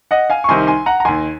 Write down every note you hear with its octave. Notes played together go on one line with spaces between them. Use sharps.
D#5 F#5
F5 G#5
C#6
C2 C3 D#3 G#5 C6
G#5 C6
F#5 A#5
A#5
D#2 D#3 G#5 C6